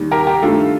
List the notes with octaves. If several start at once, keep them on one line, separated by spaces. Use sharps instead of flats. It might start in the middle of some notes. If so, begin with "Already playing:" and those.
Already playing: D#2 D#3 G3
G4 A#4
G4
G2 D#3 A3 F4 A4